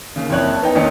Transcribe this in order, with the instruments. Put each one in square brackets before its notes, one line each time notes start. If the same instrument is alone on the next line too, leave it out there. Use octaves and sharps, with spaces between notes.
[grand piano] D#2 C#3
F#1 F2 C#5 F#6
A5
B3 D#4 G5
G#1 D#2 C#4 D#5 C#7